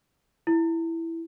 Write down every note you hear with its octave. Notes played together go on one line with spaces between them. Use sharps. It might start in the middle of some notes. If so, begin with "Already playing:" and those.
E4